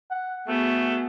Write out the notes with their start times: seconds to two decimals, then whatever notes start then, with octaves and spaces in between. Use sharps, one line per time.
0.10 F#5
0.48 A3 B3 F#4 G#4